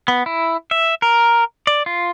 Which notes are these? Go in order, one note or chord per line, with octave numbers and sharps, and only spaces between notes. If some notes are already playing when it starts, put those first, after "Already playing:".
B3
E4
E5
A#4
D5
F4